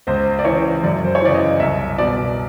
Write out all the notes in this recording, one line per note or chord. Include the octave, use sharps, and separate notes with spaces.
C#2 C5
D5
C#3 E3 C#5
F#2 D5
C5
C#5
C#3 E3 D5
D#5
C2 E5
B2 D5